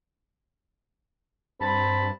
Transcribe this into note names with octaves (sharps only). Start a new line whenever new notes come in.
G2 C4 A5 B5